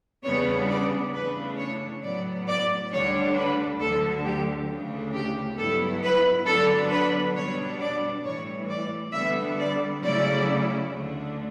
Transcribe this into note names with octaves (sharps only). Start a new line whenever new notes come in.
E2 C#3 G3 B3 D4 C#5
D5
C#3 E3 A3 D4 B4
C#5
A2 F#3 B3 D5
D5
D2 D3 G3 D4 C#5
B4
D2 D3 F#3 A4
G4
D2 C#3 E3 A3 D4
G4
G2 F#3 B3 E4 A4
B4
D3 F#3 B3 D4 A4
B4
B2 G3 B3 D4 C#5
D5
A2 E3 G3 C#5
D5
D3 G3 B3 E5
D5
C#3 F#3 A3 C#4 E4 D5
D2 D3 A3 D4